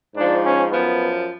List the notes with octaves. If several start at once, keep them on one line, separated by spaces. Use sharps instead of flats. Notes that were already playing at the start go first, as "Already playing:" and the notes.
G#2 F3 D4
C#4
F#2 F3 B3